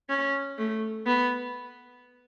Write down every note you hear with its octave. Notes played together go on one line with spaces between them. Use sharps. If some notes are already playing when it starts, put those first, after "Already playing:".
C#4
A3
B3